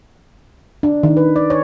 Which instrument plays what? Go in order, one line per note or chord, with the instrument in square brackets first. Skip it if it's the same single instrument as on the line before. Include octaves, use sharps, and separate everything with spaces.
[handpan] D4
D#3
B4
D5
C#5